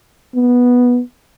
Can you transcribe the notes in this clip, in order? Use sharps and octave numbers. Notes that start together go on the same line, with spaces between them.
B3